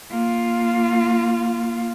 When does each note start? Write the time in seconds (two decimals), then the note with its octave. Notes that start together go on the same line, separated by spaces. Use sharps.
0.11 A#3 F4